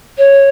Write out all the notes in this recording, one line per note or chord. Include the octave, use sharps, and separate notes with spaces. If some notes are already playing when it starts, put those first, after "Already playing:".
C#5